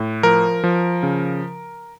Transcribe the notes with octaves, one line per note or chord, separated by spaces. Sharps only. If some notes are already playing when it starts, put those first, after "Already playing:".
Already playing: A2
F3 A#4
F3
C#3